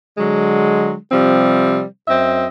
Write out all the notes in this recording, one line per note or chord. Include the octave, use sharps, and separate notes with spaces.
D3 F#3 G#3
C3 F3 G3 C4
F#2 C4 D#5 E5